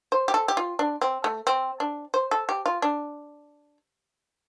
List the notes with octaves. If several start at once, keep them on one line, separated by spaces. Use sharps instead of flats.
C5
G4
A4
G4
F4
D4
C4
A3
C4
D4
C5
A4
G4
F4
D4